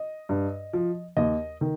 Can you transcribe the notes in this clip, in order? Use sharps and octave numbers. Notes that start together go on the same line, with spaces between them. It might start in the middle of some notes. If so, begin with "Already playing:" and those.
Already playing: D#5
G2
F3
D#2 D#5
D#3